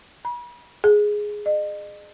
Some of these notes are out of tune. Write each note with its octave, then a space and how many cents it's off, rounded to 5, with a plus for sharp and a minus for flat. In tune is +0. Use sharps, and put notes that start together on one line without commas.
B5 -40
G#4 +5
D#5 -40